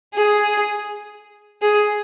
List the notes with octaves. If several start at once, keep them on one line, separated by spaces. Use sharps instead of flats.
G#4
G#4